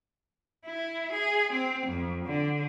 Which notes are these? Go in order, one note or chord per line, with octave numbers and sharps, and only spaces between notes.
E4
G#4
C4
F2
D3